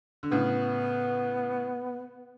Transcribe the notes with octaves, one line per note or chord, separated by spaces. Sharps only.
D3
A2 C#3 B3